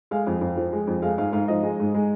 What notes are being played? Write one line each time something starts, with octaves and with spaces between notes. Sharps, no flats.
G#3 F5
F2
F2
F3
G#3
F2
G#3 F5
G#2 F5
G#2 F5
F3 D#5
G#3
G#2
G#3